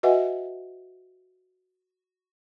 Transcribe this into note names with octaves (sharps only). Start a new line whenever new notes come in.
F#4 B4 D#5 E5 F#5 G#5